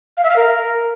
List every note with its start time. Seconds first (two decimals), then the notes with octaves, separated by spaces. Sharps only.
0.17 F5
0.24 E5
0.30 F5
0.36 A#4